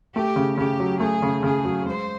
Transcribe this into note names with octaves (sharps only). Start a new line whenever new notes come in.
A3 G4
C#3
C#3 G4
F#3
A3 G#4
C#3
C#3 G#4
F#3
G#3 C5